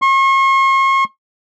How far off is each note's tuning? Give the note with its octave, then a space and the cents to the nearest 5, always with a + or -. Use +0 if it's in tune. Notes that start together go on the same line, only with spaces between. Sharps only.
C#6 -45